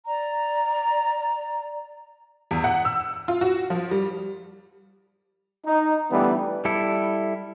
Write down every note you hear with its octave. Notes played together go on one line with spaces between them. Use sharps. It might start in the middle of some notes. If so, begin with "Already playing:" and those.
D5 A#5
E2
F#5
E6
F4
F#4
F3
G3
D#4
D3 E3 G3 A3 B3
G3 E4 A4